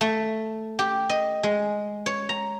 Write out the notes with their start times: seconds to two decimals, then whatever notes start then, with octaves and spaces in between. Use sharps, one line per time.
0.01 A3
0.79 G4
1.09 D#5
1.43 G#3
2.06 C#5
2.29 A#5